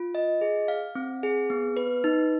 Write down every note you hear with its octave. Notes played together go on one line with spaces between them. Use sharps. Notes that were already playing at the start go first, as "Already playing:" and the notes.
Already playing: F4
D#5
G#4
F5
C4
G#4
B3
B4
D#4